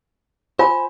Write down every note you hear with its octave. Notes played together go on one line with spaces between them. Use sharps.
F4 C5 G#5 B5